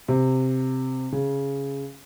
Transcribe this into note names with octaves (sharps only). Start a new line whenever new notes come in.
C3
C#3